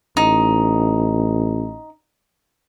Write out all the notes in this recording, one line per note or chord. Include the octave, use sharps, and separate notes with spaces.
A1 D#4